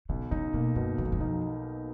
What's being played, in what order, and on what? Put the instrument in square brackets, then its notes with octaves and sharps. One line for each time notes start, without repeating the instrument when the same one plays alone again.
[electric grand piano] B1 [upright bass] C#3
[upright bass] C#3 [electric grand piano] D#4
[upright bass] B2 [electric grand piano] A#3
[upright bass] F#2 [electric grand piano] B2
[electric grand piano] B1 [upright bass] F#2
[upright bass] F2
F#2
[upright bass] F2 [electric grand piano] D#4